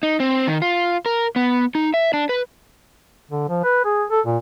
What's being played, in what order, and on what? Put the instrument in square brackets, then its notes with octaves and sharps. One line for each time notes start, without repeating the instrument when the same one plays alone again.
[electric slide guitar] D#4
C4
D#3
F4
A#4
B3
D#4
E5
D4
B4
[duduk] D3
F3
B4
G#4
A4
A#2